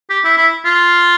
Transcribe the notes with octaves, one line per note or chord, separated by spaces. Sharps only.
G4
E4
E4
F4